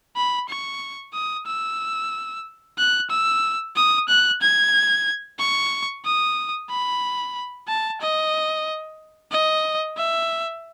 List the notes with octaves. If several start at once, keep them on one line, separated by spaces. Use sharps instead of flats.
B5
C#6
D#6
E6
F#6
E6
D#6
F#6
G#6
C#6
D#6
B5
A5
D#5
D#5
E5